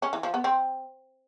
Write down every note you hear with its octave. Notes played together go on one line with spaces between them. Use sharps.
C#4
E3
F3
B3
C4